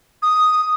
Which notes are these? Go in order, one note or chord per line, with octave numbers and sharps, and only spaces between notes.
D#6